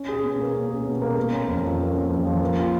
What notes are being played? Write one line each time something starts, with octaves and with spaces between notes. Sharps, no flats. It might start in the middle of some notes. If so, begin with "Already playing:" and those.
Already playing: C#4
G#4
B2
A#3
C#4
G#4
B2
A#3
A#3
C#4
F2
F3
A#3
C#4
F2
F3
A#3
F4